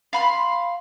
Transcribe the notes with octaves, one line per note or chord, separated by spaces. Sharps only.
F5 B5 C6